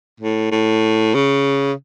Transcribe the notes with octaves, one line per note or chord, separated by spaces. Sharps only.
A2
A2
C#3